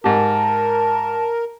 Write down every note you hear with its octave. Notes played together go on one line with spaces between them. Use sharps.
G#2 G4 A#4 A5